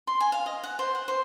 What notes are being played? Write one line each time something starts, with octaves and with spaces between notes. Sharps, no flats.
C6
G#5
F5
D#5
F#5
C5
F#5
C5